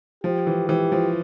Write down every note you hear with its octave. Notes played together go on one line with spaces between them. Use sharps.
F3 G4
E3
E3 G4
F3